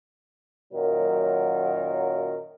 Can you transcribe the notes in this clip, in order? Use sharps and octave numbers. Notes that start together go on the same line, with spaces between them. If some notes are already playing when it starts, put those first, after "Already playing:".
F#2 A#2 D#3 F#3 A#4